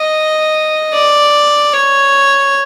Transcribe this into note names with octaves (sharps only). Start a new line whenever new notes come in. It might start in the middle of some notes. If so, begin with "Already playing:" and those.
Already playing: D#5
D5
C#5